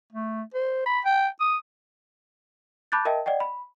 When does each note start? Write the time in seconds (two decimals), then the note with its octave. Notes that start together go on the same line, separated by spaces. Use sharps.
0.12 A3
0.54 C5
0.86 B5
1.05 G5
1.40 D#6
2.92 A5 B5 D6 F#6 G6 A6
3.05 A#4 D#5 E5 G5 A5
3.26 D5 D#5 F#5 G5
3.40 B5